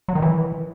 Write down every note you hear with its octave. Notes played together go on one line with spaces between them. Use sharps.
F#3
D#3
E3